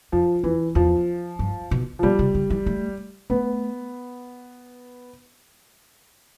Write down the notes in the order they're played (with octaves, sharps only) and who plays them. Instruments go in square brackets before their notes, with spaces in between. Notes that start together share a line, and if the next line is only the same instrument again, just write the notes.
[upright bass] F2 [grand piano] F3
[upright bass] E2 [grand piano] E3
[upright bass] E2 [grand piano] F3
[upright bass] G2
B2
[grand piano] F3
[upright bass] B2 [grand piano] G3
[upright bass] C3
D3
E3
A3
[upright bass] A3 [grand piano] B3